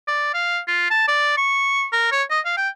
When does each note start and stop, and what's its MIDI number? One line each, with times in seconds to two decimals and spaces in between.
0.08 0.30 74
0.34 0.59 77
0.68 0.86 65
0.91 1.05 81
1.08 1.37 74
1.37 1.86 85
1.93 2.08 70
2.12 2.23 73
2.31 2.40 75
2.46 2.54 77
2.57 2.69 79